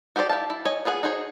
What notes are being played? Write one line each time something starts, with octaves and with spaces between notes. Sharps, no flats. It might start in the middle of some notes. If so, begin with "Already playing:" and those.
F#4 G4 A4 C5 D5
E4 G4 F5 A5
E4
C#5 D#5 G#5
B3 F4 G#4 C5 F#5
D#4 F#4 G#4 C5 C#5